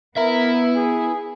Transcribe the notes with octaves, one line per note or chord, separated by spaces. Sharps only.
B3 E4 A#4 E5
G#4